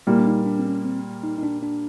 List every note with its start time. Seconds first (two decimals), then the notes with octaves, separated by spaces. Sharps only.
0.07 A#2 G3 A#3 E4
0.19 D4
0.26 D#4
0.46 D4
0.59 C4
0.65 C#4
0.85 C4
1.24 D#4
1.38 D#4
1.43 D4
1.62 D4